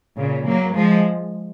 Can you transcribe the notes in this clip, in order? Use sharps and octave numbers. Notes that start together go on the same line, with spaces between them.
A#2 C#3
F#3 A#3
F3 G#3